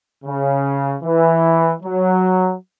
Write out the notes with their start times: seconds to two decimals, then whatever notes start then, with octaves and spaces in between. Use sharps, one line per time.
0.25 C#3
1.03 E3
1.83 F#3